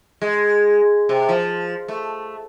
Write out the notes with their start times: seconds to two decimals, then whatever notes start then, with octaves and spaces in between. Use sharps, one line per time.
0.22 G#3
1.09 C3
1.29 F3
1.88 A3